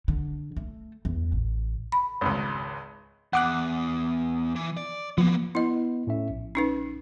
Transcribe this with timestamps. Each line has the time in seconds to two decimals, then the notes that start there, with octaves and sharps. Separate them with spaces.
0.08 D3
0.57 A3
1.05 E2
1.32 A1
1.92 B5
2.21 G#1 C#2
3.33 E2 F#5 D6 F#6
4.56 E3
4.77 D5
5.18 F3 A#3 B3
5.55 B3 E4 D#5
6.07 A2 C#4 E5
6.30 A#1
6.55 C#4 D#4 B4